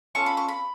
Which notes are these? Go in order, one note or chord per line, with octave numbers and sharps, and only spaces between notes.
C#4 F4 A4 C#6
B5
C#6
B5